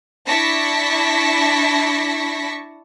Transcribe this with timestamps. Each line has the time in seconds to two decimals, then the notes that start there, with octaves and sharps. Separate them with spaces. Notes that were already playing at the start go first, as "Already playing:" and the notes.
0.27 D4 E4 A5 C#6 A#6 B6